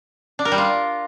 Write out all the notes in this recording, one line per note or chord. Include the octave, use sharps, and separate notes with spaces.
D4
A#4
G3
F4